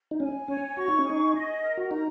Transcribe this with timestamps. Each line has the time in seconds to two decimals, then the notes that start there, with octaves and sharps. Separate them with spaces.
0.11 D#4
0.20 C#4 G#5
0.48 C#4 C#5
0.77 F#4 C#6
0.88 D#4
0.99 C#4
1.05 D#4 G#4
1.34 D#5
1.62 A#4
1.77 F#4
1.91 D#4 A#5